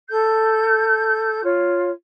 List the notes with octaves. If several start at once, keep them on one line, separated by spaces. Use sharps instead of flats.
A4 G6
F4 C#5